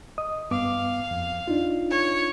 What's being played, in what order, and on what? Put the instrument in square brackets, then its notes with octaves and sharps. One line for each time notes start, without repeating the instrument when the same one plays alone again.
[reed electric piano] D#5 D#6
[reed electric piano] G2 B3 D6 [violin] F5
[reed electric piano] F2
D4 D#4 F4
[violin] C#5